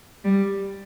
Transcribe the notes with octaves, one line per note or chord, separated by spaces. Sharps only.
G3